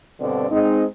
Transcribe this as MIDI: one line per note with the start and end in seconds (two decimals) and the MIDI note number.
0.21 0.47 43
0.21 0.47 47
0.21 0.47 50
0.21 0.47 60
0.21 0.47 74
0.51 0.84 56
0.51 0.84 60
0.51 0.84 63